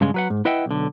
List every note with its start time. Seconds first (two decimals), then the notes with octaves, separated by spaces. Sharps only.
0.01 G2 C#3 G#3
0.14 F#3 B4 F#5
0.30 G#2
0.45 E4 B4 D#5 E5 F#5 G5
0.66 B1 D3